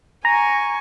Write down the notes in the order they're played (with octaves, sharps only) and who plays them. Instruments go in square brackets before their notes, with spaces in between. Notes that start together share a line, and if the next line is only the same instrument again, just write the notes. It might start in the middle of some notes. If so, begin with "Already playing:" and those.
[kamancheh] G#5 C#6 [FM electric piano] A#5